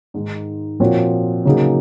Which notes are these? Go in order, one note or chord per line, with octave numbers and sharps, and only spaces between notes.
G#2 D#3 G#3 D#4
A#2 F3 C4 F#4 C#5
C#3 F#3 A#3 D#4 G#4